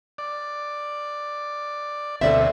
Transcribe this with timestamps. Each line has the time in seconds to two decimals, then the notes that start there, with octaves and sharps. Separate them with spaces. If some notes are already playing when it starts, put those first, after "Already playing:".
0.18 D5
2.21 D2 B2 C4 A4 D5 E5